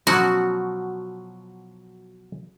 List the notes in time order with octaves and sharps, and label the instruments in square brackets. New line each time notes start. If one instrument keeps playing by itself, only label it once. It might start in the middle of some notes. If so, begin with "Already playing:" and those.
[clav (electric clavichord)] B2 F3 F#3 [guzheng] F#4